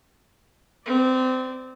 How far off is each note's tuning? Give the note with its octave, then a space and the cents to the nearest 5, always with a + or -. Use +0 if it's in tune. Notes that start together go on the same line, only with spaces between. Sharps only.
C4 -25 D5 +0